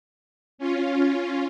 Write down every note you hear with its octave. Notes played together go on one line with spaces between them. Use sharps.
C#4 F4